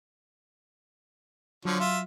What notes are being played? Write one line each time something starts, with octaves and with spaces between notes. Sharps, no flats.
D3 F3 F#3 C#5
F4 E5